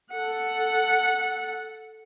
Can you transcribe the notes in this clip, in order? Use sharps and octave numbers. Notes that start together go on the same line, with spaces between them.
A4 F#5